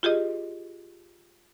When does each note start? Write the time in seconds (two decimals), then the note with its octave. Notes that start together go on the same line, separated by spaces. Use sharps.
0.03 F4 G4 G#4 D#5